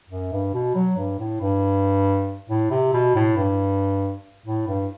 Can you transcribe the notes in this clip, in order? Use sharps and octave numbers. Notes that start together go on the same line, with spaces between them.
F#2
G2
B2
F#3
G2
A2
G2
A2
C3
B2
A2
G2
A2
G2